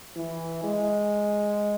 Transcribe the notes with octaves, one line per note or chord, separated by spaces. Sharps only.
E3
G#3